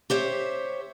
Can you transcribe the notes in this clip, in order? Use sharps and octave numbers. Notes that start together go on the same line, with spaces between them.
G4 C5 C#5 E5